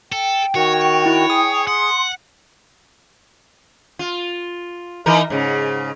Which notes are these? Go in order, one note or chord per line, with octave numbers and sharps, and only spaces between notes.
A4 G5
D#3 F#4 C#5
E4
G#4 D#6
F#5 C6
F4
E3 D#4 A#4
G#2 C#3